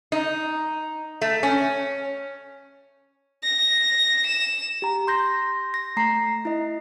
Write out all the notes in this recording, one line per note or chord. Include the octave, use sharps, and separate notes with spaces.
D#4
A3
C#4
A#6
E7
G4 A#5
C6 G6 A#6
A#6
A3 A#5 C7
E4 D#5